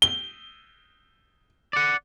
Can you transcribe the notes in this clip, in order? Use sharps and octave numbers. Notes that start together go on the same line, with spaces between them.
G7
D5 F#5